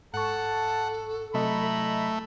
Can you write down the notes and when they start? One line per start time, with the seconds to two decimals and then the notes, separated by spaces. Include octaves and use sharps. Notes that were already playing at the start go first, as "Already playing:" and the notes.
0.14 G#2 A4 F#5 A5 C#6
1.34 C3 F#3 A3 E4 D#5 A#5 B5